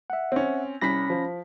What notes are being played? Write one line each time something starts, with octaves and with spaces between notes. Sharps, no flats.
E5 F#5
C4 C#4
C2 C#4 B5 A#6 B6
F3